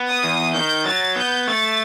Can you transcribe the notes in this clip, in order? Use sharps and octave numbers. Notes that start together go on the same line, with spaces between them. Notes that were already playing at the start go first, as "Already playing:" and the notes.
Already playing: B3
D#6
E2
D#3 G6
F#3 A6
B3 G6
A3 A6